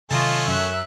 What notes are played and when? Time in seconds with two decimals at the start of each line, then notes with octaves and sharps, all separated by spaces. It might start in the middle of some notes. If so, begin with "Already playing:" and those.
0.11 C3 D#3 F#3 A3 C#4 F4 D#5 A5
0.47 F#2 E5 F#6